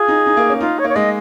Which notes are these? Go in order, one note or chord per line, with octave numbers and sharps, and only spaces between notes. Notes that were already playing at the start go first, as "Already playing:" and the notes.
Already playing: F4 G#4
D#4
D#4
A#3
C#4
D#4 F4
C#5
A#3
C#5
G#3 D#5